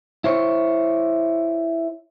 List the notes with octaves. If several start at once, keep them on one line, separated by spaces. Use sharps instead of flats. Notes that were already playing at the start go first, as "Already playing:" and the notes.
E4 C5 C#5